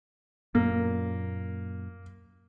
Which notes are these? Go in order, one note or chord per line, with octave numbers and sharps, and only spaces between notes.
F#2 A#2 A#3